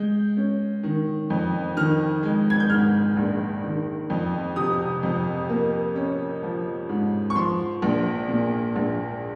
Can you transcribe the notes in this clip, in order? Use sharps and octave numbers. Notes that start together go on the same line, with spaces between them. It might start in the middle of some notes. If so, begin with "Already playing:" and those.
Already playing: G#3 G6
C#4
D#3
F2
D#3 F6
G#3
G#6
G6
G#2 F6
A#1
D#3
F2
C3 D#6
F2
A#3
C#4
F3
G#2
C#6
F3 C6
A#1
A#2
A#1